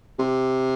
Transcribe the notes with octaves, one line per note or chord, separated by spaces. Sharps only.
C3